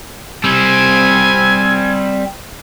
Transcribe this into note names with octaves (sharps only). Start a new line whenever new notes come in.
G3 C4 G#5